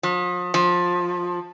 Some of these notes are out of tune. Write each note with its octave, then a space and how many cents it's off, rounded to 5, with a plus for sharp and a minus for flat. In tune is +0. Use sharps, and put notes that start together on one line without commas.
F3 +40
F3 +20